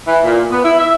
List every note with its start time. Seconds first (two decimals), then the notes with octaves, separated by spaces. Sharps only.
0.07 E3
0.25 A#2
0.50 B3
0.65 E4
0.79 E5